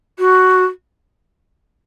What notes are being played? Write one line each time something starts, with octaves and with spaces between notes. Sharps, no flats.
F#4